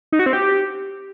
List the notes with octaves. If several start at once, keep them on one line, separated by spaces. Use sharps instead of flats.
D#4
F#4
C4
G4